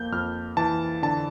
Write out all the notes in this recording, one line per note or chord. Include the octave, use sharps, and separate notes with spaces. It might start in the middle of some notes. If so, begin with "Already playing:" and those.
Already playing: F2 A#3 G6
F2 F6
E3 A5
D3 A5